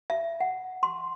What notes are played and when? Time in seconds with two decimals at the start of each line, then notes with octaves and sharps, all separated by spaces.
0.10 E5
0.40 F#5
0.83 C6